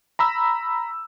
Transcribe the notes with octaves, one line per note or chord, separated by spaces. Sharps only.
A#5 B5 E6